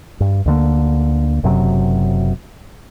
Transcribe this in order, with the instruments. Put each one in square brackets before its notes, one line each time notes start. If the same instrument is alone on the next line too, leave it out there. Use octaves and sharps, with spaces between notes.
[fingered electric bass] G2
D2 D3 A#3
F#1 F#2 C3 F#3